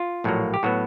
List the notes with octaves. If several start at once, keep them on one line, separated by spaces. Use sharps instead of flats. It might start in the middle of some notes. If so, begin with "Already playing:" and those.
Already playing: F4
A#1 A2 F#3 A#3
G4
A2 F#3 B3 F#4